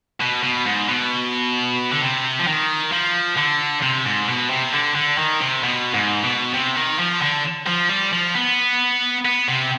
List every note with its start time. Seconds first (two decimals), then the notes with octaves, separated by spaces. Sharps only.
0.20 B2
0.43 B2
0.65 G#2
0.88 B2
1.91 D3
2.02 C3
2.39 F3
2.47 D#3
2.92 F3
3.37 D3
3.83 C3
4.05 G#2
4.28 B2
4.50 C3
4.73 D3
4.95 D3
5.18 D#3
5.41 C3
5.63 B2
5.94 G#2
6.24 B2
6.54 C3
6.76 D#3
6.99 F3
7.22 D3
7.67 F3
7.89 G3
8.12 F3
8.35 B3
9.25 B3
9.48 C3